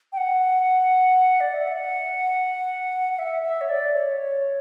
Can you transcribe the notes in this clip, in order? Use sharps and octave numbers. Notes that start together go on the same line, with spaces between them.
G5
F#5
D5
E5
F#5
F#5
E5
E5
C#5
D5
C#5